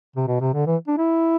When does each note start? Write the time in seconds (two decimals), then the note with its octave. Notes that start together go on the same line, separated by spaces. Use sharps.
0.16 C3
0.27 B2
0.41 C3
0.53 D3
0.67 E3
0.88 D4
0.97 E4